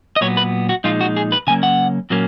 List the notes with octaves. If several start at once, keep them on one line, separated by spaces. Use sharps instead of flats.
D#5
A#2 F#3 B3 C#5
B4
F#4
A#2 F3 G#3 D#4 F4
F#4
G#4
B4
C#3 F#3 A#3 C#4 G#5
F#5
A#2 F#3 A#3 C#4